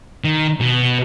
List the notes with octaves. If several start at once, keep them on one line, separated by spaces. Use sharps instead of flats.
D#3
B2